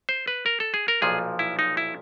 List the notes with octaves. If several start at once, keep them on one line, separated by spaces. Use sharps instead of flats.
C5
B4
A#4
A4
G#4
A#4
B1 A#2 F3 G#4
E4
D#4
E4